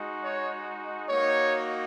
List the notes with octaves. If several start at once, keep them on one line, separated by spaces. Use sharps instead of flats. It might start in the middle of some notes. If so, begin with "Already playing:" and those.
Already playing: G#3 D#4 F#4
C#5
A#3 D#4 F#4 C#5